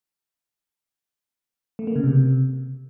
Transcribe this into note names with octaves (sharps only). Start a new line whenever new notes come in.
A3
A#3
C#3
C3